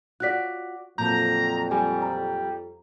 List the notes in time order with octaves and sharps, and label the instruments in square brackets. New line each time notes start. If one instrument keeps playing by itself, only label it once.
[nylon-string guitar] F4 F#4 D5 [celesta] F#6 B6
[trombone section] F2 [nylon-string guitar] A#2 F#3 [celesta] A5 G6 [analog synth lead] A#5
[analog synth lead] G3 [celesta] G#5
[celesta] A#5